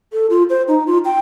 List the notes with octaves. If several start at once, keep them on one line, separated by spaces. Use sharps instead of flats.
A4
F4
C5
D#4
F4
G5